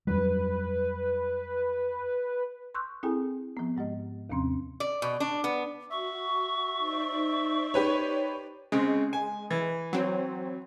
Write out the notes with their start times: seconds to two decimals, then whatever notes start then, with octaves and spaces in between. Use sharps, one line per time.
0.07 F2 F#3 G3 B4
2.75 C6 C#6 E6 F#6 G6
3.03 C4 E4 G#4 A4 G5 G#5
3.57 F3 B3
3.77 G#2 G#3 G4 D#5
4.30 D#2 C3 F3 C4 C#4 C6
4.80 D5
5.02 B2
5.20 D4
5.44 B3
5.91 F#4 E5 C#6
6.77 D#4 C5 D5
7.74 G4 B4 C#5
8.72 C#3 G#3 C4
9.13 G#5
9.51 E3
9.93 F#3 C4